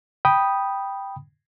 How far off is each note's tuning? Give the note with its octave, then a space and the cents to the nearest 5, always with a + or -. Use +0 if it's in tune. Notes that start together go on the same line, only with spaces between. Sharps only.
G5 +0 B5 -10 D#6 +0